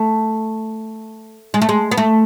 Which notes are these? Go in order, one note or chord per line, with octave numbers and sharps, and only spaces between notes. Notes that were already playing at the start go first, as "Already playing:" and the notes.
Already playing: A3
G#3
A3
G#3
B3
A3